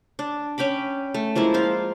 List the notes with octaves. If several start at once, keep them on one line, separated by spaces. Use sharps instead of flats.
D4
C#4 G5 B5 D6
A3
F3 G#3 A#3 E4
F4 C5